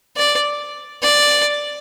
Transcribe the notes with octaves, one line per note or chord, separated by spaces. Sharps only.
D5
D5